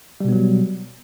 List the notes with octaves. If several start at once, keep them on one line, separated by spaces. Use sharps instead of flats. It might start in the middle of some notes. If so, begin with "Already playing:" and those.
B2 F#3 G3 B3